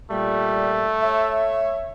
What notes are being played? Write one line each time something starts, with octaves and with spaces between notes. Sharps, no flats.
A#2 G3 A3
C#5 E5